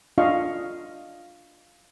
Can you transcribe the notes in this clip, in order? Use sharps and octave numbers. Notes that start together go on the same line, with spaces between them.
D4 F4 D#5 F5 C#6